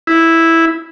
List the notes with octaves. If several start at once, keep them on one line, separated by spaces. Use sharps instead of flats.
E4